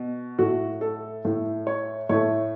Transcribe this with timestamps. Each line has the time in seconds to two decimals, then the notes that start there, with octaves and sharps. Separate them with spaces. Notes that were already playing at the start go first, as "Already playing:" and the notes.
Already playing: B2
0.39 A2 A3 F#4
0.81 A4
1.25 A2 A3
1.67 C#5
2.09 A2 A3 C#5